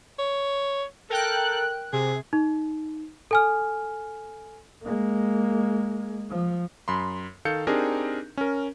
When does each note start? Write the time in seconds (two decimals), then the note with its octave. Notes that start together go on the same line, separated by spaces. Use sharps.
0.19 C#5
1.10 A4 A#4 G5 F#6
1.93 C3 G#4
2.33 D#4
3.31 A4 G#5 F6
4.83 G#3 A#3
6.30 F3
6.88 F#2 B5 C6
7.45 D#3 A4 F5 G6 C#7
7.67 C4 D4 D#4 G4 G#4 A#4
8.37 C#4 A#4